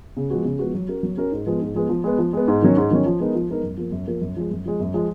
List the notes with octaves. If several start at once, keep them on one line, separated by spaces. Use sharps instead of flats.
C#3
F3 G#3 B3 F#4
C#3
F3 G#3 B3 F#4
F#3
C#4 F#4 A#4
F#3
C#4 F#4 A#4
G#2
F3 G#3 B3
G#2
F3 G#3 B3
F3
G#3 B3
F3
G#3 B3
G#2
D#3 F#3 C#4
G#2
D#3 F#3 C#4
F3
G#3 B3 D#4 A#4
F3
G#3 B3 D#4 A#4
F#2
F3 A#3
F#2
F3 A#3
F#2
F3 G#3
F#2
F3 G#3
F#2
F3 G#3